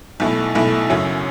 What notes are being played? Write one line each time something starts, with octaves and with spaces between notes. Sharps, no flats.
B1 B2 A3 E4
B1 B2 A3 E4
F#2 C#3 F#3 C#4